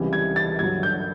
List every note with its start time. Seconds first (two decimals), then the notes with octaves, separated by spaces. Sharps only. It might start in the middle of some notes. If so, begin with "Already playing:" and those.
Already playing: C#2 C3 E3 G3
0.13 G#6
0.36 A6
0.59 G2 D3 F#3 G#6
0.83 G6